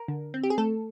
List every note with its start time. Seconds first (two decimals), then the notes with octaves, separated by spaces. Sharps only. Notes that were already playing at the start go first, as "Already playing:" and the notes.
Already playing: A#4
0.08 D3
0.34 C4
0.43 G4
0.50 G#4
0.58 A3 A4